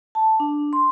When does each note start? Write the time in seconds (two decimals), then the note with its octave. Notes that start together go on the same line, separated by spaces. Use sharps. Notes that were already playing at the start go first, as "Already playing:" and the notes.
0.15 A5
0.40 D4
0.73 C6